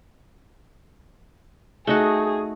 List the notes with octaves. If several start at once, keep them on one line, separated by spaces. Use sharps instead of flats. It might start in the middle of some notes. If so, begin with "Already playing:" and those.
A3 D#4 F#4 G#4